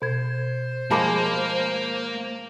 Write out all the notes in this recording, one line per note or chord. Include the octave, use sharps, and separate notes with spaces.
B2 C5 G#6
F3 G#3 A#3 A#4 A5 B5 D6